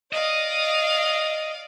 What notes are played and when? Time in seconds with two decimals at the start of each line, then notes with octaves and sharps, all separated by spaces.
0.13 D5 D#5 F5